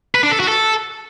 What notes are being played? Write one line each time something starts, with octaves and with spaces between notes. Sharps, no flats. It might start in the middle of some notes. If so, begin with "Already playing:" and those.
B4
D4
A4
F#4
A4